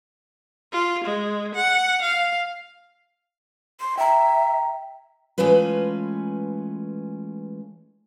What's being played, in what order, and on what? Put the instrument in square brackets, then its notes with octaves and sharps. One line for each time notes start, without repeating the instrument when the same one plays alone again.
[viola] F4
G#3
F#5
F5
[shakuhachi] C6
[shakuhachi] E5 [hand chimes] G5 A#5
[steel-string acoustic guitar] E3 G#3 A3 C#4 F4 B4